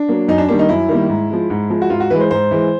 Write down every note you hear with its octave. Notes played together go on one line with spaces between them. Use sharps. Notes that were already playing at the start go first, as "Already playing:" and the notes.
Already playing: D4
F#3 A#3
F#2 D#4
D4
D#3 G3 A#3 D4
D#4
F#2 E4
D#3 G3 A#3
G#2
F3 G#3
G#2
F3 G#3
F#4
G#2 F4
F#4
E3 G#3 B4
C5
G#2 C5
E3 G#3